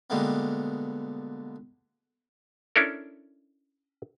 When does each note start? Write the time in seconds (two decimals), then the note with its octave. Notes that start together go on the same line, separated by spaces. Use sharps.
0.10 B2 D3 G3 G#3 A#3 B3
2.76 C#4 D4 E4 A4 A#4